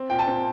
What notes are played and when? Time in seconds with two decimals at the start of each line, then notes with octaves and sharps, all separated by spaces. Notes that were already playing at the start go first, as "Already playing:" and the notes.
Already playing: C4
0.10 A#2 G5
0.19 A5
0.27 C4